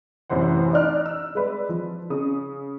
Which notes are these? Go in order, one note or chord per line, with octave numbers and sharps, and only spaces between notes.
A1 F#2 C3 E3 C5 F#5
D4 D#4 D5 F6 F#6
E6
G#3 B4 D5
F3
C#3 D#6